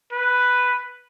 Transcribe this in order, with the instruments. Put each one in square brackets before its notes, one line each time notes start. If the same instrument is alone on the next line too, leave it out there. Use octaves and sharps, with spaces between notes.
[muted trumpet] B4